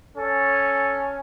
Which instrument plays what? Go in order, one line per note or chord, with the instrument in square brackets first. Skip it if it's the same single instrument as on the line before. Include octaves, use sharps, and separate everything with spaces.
[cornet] C#4 [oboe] A4